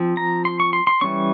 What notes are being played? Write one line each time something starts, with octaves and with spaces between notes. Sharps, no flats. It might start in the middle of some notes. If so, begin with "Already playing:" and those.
Already playing: F3 C4
A#5
C6
C#6
C6
C6
E3 G3 C#4 C#6